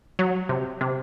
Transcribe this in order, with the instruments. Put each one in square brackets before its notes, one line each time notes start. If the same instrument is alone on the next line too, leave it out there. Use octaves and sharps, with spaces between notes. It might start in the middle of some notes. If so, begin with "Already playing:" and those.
[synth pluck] F#3
C3
C3